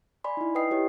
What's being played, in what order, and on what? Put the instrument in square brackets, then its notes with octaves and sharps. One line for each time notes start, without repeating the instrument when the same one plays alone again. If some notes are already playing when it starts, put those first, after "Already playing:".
[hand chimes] D5 G#5 B5 C6
D#4 E4
B4 D#5 G5 D#6 C7
E4 G4 C#5